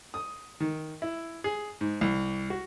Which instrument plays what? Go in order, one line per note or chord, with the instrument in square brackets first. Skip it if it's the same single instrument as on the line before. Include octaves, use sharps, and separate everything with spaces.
[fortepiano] D#6
D#3
E4
G#4
G#2
C2
F#4